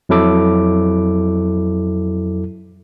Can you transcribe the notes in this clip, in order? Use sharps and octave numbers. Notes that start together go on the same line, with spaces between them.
F2 F#3 E4 A4 D6